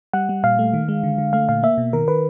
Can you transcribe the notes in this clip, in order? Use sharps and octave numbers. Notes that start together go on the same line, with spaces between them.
G3 F#5
G3
A#2 F5
A3
D#3
G#3
D3
D3
A3 F5
A#2 F5
A#3 E5
B2
D#3 A#4
D#3 B4